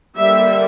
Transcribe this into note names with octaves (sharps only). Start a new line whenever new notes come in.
D3 G3 A#3 E5